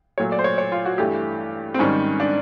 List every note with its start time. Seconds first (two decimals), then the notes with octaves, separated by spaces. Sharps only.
0.18 A#2 F#3 A3 C#5
0.32 D5
0.39 C5
0.44 C#5
0.58 C#5
0.72 F4
0.85 F#4
0.98 G2 E3 A3 G4
1.74 C4
1.79 G#2 D#3 G3 C#4
2.20 D4